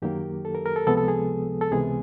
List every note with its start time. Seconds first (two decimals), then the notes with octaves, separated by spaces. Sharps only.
0.02 F#2 D#3 F#3 A#3 G4
0.45 A4
0.55 A#4
0.66 A#4
0.76 A4
0.87 C#2 C3 F3 G#3 B3 A4
0.97 A4
1.08 G#4
1.61 A4
1.71 C#2 C3 E3 G#3 B3 G#4